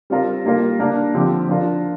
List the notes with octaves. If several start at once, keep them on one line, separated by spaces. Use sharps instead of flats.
G3 C4 F4 A#4
G3 A#3 F4 A#4
A#3 D4 A#4
D3 F3 C4 G4
F3 D4 F4 A#4